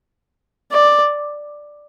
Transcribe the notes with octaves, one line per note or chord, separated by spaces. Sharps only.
D5